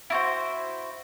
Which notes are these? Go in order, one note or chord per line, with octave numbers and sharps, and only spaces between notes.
E4 F#4 C5